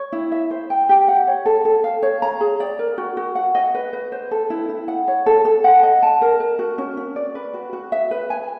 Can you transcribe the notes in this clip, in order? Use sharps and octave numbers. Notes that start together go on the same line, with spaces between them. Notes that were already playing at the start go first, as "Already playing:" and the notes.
Already playing: C#5
E4
E5
C5
G5
G4
F#5
C#5
A4
A4
F5
C#5
A#5
G#4
D5
A#4
F#4
F#4
F#5
D#5
B4
B4
C5
A4
E4
E4
F#5
C#5
A4
A4
F#5
D#5
A5
A#4
A#4
F#4
C#4
C#4
D5
B4
F#4
F#4
E5
B4
G#5